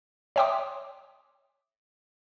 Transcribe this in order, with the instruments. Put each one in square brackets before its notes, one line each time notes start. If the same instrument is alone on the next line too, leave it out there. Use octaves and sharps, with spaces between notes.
[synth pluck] C#5 E5 G5 C6 D6 D#6